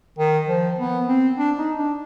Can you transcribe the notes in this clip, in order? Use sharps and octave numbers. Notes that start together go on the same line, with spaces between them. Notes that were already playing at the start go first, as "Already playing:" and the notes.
D#3
F3
B3
C4
D4
D#4
D4